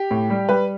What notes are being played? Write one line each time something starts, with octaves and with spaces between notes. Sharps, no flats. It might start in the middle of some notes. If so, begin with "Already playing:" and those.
Already playing: G4
A2
G3
G3 B4